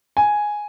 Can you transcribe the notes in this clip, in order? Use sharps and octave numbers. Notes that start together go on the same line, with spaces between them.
G#5